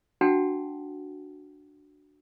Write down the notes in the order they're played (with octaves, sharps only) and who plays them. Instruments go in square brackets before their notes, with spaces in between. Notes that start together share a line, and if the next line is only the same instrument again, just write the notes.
[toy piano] D4 F#4 F#5 G5 A5